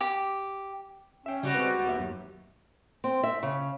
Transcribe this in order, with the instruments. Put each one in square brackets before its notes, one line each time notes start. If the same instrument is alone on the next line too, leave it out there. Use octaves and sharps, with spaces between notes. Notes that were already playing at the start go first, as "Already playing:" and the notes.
[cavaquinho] G4
[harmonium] C#4 [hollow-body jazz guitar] E5 G5
[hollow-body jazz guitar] C#3 [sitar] G3 F#4
[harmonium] G#3 C4 [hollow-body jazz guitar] B4
[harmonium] D#2
[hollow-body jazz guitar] B3 G4 E5
F#2
[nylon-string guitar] C4
E5
C#3